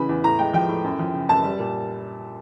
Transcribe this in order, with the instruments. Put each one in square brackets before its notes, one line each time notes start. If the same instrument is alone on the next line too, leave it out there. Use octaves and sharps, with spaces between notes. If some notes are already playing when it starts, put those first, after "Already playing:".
Already playing: [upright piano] C#3 E3 B5
E2
A2 A#5
G#3 G5
F3 G5
A2
F#2
F3
C#3
F#2 A5
G3
A#2